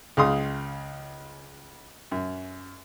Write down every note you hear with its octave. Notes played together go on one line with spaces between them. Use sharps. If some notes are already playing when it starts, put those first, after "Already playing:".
C#2 C#3 F5 C6 D#6
F#2